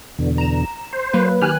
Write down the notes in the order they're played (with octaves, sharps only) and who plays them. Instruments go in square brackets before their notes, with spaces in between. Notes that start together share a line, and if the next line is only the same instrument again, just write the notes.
[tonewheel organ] E2 B2 D3
[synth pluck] A#5 E7
[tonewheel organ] C5
[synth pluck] F#3 A#3 B4
[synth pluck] D#3 G#5 F#6 [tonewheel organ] G4 F6